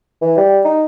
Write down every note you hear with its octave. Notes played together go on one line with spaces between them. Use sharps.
E3
G3
D#4